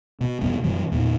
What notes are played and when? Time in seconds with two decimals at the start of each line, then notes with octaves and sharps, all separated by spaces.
0.21 B2
0.41 F2 B2 G3 B3
0.64 F#2 B2 E3 G3
0.92 E2 A#2